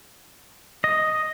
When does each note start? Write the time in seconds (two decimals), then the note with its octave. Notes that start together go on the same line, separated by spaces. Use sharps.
0.84 D#5